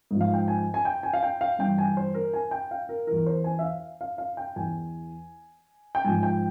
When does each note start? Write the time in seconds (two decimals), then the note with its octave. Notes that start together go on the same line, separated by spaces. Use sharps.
0.11 G#2 F3
0.21 F5
0.34 G5
0.48 G#5
0.74 G#5
0.85 G5
1.03 G#5
1.13 F5
1.23 G5
1.41 F5
1.59 G2 E3 G5
1.78 G#5
1.97 C5
2.14 A#4
2.34 G#5
2.51 G5
2.71 F5
2.89 A#4
3.07 E2 E3 A#4
3.26 C5
3.44 G#5
3.59 E5
3.63 F5
4.01 F5
4.18 F5
4.37 G5
4.56 E2 E3 G#5
5.95 G5
6.04 G#2 F3 G#5
6.23 G5